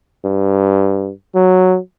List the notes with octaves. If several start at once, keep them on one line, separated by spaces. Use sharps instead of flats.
G2
F#3